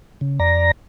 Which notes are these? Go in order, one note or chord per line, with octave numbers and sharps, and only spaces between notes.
C#3
F2 D5 A#5 A#6